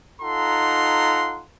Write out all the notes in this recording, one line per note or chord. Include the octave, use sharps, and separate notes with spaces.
D#4 F4 A4 F#5 A#5 C6